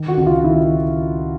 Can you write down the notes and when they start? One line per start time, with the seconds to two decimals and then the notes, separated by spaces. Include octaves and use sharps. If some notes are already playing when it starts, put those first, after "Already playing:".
Already playing: D#3
0.08 F#4
0.17 C#2
0.26 F4
0.44 D#3 E4